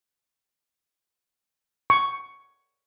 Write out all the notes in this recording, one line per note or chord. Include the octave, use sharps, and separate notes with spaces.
C#6